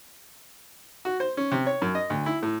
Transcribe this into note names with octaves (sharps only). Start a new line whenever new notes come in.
F#4
C5
C#4
C3
C#5
F#2
D#5
D2
E4
A2